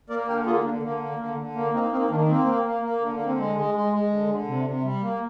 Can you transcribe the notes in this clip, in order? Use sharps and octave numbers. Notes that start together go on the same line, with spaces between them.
A#3 A#4 D5
D3 G4 A#4
A#3 F4 G#4
D3 A#3 D4
D3 A#3
A#3
D3 A#3
D3
A#3
A#3 C4 D#4
A#3 C4 D#4
D#3 A#3 D4
A#3 C4
A#3
A#3
A#3
D3
A#3
D3
C4
G#3
G#3
G#3
G#3
D3
D3
C3
C3
G3
A#3